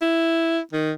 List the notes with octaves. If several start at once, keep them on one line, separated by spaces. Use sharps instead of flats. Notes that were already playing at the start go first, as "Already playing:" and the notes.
E4
D#3